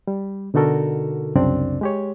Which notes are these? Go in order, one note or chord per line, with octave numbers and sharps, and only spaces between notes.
G3
B2 D3 D#4 F#4 A4 A#4
C2 F#2 C#3 C4 D4 D5
G#3 G4 C#5